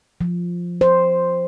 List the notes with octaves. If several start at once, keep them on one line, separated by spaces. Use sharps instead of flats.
F3
C5